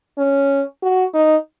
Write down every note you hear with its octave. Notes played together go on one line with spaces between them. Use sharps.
C#4
F#4
D#4